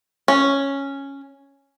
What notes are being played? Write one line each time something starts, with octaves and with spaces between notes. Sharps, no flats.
C#4